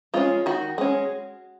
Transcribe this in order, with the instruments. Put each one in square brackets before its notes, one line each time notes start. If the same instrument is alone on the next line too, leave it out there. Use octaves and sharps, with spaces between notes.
[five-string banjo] G#3 C#4 F4
D#3 F#4
G#3 C#4